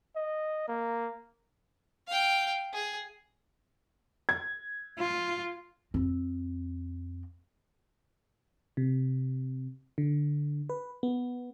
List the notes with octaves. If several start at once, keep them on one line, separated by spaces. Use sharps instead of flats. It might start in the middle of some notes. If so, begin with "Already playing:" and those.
D#5
A#3
F5 G5
G#4
G#6
F4
F2 C4
C3
D3
B4
B3